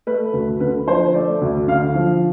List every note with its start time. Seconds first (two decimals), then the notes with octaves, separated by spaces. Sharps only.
0.07 A3 B4
0.33 D2
0.60 D3 B4
0.87 F3 C5
1.14 A3 D5
1.41 D2
1.67 D3 F5
1.95 F3